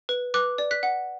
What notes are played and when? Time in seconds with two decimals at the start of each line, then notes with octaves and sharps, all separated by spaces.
0.09 B4
0.34 B4 D6 F#6
0.58 D5
0.71 F#6 B6
0.83 F#5